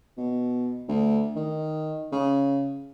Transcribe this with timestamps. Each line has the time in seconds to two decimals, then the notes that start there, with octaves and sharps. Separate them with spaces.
0.17 B2
0.88 D2
1.36 D#3
2.12 C#3